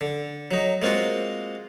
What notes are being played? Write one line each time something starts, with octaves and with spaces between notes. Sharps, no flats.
D3
F#3 D#4
G#3 A#3 C4 F4 F#4